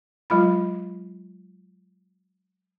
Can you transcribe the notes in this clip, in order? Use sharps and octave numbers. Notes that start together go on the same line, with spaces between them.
F#3 G#3 F4 B5